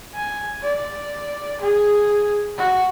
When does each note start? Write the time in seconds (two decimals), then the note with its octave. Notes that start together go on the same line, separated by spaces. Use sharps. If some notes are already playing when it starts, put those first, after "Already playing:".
0.15 G#5
0.63 D5
1.61 G#4
2.58 F#4